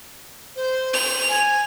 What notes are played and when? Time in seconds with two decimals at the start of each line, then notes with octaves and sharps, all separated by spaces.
0.55 C5
0.93 F7
1.29 G#5